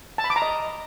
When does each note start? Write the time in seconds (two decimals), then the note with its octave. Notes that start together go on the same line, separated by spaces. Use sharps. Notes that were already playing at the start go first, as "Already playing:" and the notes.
0.18 A5
0.24 B5
0.30 D6
0.36 A#5
0.42 D#5